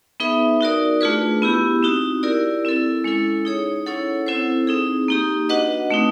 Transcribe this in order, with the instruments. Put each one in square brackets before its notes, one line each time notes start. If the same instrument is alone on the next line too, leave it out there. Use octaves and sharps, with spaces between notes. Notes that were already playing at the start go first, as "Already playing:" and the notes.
[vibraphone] B3 D#4 G#4 B4 E5
D#4 F#4 A#4 D5
A3 D4 F4 G#4 B4
B3 E4 G4
C4 D#4 F#4
E4 G4 A#4 D5
C4 E4 A4
G#3 C#4 E4 A4
D#4 G#4 C#5
C#4 E4 A4 C#5 F#5
C4 E4 A4 C5
C4 D#4 G#4
A#3 D#4 G4
D4 F#4 B4 D#5 F#5
A3 C4 D#4